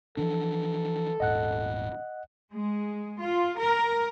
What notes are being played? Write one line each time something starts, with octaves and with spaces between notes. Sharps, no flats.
E3 F3 D4 A4
D#1 G#2 D#5 F#5 F#6
G#3
F4
A#4